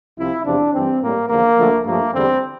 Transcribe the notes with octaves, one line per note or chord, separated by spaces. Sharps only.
C2 C3 F3 E4
E2 C3 F3 D4
G2 E3 G3 C4
A2 G3 A#3
E2 D3 F3 A#3
D2 D3 F3 A3
G2 F3 A3 A#3
E2 D3 G3 C4